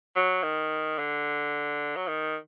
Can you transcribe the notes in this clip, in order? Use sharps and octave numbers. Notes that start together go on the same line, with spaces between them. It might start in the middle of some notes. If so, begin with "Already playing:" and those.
F#3
D#3
D3
F#3
D#3